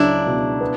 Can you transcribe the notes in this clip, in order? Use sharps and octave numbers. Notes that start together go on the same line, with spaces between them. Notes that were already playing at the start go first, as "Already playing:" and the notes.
Already playing: C#2 F#3 D4 E4
B2
B3